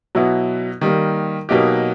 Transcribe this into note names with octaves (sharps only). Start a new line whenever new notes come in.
B2 F#3 B3 E4
D#3 G3 A#3
B2 F#3 A#3 D#4 G4